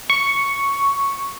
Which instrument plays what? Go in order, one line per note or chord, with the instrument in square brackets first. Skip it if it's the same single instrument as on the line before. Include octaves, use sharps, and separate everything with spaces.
[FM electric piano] C#6